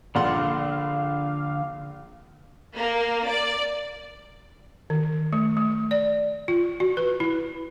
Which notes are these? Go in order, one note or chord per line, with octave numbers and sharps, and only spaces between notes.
A#1 D3 D5 F5 F#5 C6
A#3
D5
D#3
A3
A3
D5
F4
F#4
B4
E4